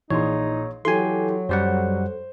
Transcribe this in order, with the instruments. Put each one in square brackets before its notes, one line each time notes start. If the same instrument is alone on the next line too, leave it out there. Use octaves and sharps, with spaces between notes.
[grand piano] A#1 G#4 C6 [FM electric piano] E3 [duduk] D#4 [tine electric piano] C#5
[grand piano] E3 G4 [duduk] F#3 [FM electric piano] A4 [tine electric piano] G#5 C6
[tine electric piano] F#2 G3 F#5 [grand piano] C5